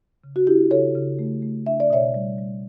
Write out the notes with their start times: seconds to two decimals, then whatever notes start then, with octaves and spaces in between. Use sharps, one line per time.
0.24 C#3
0.36 F#4
0.47 D4 E4 G4
0.71 C#3 A4 C#5
0.95 C#3
1.19 A3
1.42 A3
1.66 D4 E5
1.80 D5
1.90 B2 C#5 E5
2.14 G3
2.38 G3